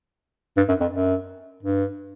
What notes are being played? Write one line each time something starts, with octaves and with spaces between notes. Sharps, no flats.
G2
F#2
F2
F#2
G2